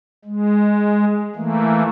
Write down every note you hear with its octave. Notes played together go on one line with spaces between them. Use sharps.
G#3
E3 A3 A#3